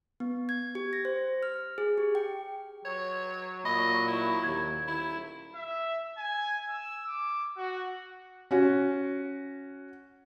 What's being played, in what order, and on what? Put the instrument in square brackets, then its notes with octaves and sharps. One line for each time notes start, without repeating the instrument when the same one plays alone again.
[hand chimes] B3
G#6
G4
A#6
C5
F6
G#4
G4
G5
[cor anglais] F#3 [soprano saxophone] C#5
[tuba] A#2 [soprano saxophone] D#5 [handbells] B5
[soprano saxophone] E4
[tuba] D#2 [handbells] G#6
[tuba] D#1 [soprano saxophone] E4
[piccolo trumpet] E5
G#5
E6
D6
F#4
[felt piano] C#4 F#4